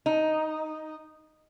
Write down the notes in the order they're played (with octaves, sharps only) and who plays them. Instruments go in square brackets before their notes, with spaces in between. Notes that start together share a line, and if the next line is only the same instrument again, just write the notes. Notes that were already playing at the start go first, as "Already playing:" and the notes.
[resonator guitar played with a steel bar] D#4